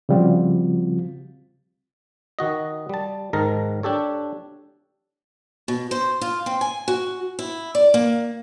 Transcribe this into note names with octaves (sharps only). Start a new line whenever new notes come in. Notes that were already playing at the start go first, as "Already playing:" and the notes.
C#3 F3 G3 C4 F4 F#4
D#3 F#4 D#5
G3 A5
G#2 D#3 A#4 A5 A#5
D4 G4 A4 C#5
B2
C5
F4
C4
G#5
F#4
E4
D5
A#3